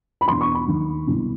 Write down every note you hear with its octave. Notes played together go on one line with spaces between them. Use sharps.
B5
E2 B2 C6
C#6
B5
D#2 D#3
C2 B2